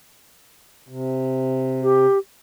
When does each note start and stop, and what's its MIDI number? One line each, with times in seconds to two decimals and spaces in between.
0.89 2.06 48
1.82 2.18 67